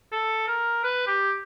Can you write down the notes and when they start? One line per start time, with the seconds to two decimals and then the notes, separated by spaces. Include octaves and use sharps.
0.12 A4
0.48 A#4
0.84 B4
1.07 G4